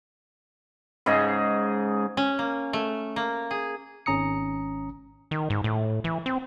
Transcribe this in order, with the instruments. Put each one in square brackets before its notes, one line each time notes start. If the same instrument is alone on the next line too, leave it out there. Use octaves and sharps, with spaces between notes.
[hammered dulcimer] G#2 C#3 G#4 D#5
[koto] C#4
A#3
A3
A#3
G#4
[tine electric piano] G#1 C#4 A#5 D#6 C#7
[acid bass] D#3
G#2
A2
E3
C4